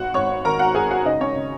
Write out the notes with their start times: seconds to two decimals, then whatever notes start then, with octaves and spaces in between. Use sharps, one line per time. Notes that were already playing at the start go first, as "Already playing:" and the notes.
Already playing: G#1 F#4 F#5
0.14 G#1 C#5 C#6
0.45 D#3 A#4 A#5
0.59 F#4 F#5
0.74 G#1 G#4 G#5
0.91 F#4 F#5
1.05 C#3 D#4 D#5
1.21 C#4 C#5
1.35 C#3